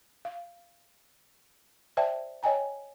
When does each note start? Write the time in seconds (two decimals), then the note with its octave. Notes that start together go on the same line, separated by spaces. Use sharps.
0.25 F5
1.97 C5 D5 E5 G5 A5
2.43 C#5 D#5 G5 G#5 A#5